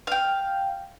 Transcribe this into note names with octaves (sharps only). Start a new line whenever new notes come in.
F5 G5